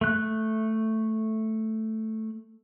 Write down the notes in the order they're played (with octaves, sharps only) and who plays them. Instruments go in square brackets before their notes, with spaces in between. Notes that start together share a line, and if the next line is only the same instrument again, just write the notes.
[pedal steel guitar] A3 F#6